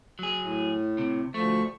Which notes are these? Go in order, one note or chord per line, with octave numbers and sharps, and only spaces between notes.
F#3 G#4
A2
C3
D2 F3 A3 C#6